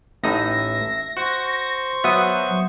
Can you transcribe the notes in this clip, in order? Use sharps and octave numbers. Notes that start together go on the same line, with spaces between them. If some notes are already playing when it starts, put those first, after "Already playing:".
A1 A2 D#4 E5 A#6
F#4 C5 C#6
F#3 B3 E5 F#5 D#6